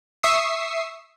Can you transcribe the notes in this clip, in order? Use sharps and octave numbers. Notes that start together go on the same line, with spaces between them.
E5 C#6 D#6 E6 C7